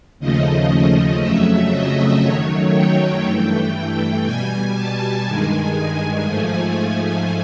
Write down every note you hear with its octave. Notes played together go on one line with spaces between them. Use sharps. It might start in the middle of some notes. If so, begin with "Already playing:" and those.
D#2 C#3 F3 A3 D#5
F2 C#3 F#3 A3 E5
D#5
F#2 D#3 F#3 A3 C#5
G5
G2 E3 A3
B2 G3 G#5
A5
G2 D#3 G#3 G#5
G#5
G#2 F3 A3 G#5
G#5